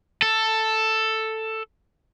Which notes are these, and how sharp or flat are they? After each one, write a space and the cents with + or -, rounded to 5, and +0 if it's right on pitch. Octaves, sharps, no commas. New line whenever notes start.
A4 +5